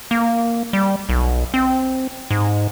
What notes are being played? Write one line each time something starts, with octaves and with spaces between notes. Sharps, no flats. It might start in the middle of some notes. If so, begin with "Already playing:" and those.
A#3
G3
B1
C4
G#2